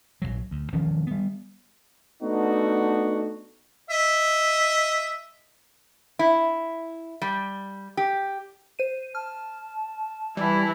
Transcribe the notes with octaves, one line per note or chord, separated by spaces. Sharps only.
A#1 D#2 F#3
D2
E1 D#3 F3 C#4
G3 B3
A3 B3 D4 D#4 F#4
D#5 E5
E4
G3
G4
C5 D#7
A5 F6
E3 G3 E4